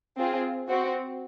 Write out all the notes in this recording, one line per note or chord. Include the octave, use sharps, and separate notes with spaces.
C4 F4 G#4
C4 F#4